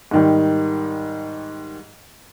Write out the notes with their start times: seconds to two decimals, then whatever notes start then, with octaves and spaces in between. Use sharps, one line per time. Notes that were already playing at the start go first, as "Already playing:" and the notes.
0.11 G#2 D#3 G3